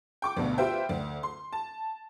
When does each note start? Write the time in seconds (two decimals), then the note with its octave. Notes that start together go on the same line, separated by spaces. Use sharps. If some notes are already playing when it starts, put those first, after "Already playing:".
0.22 G5 C#6 D6
0.37 D2 G2 B2
0.58 F4 G4 B4 C5 E5 G5
0.89 D2
1.23 C6
1.53 A5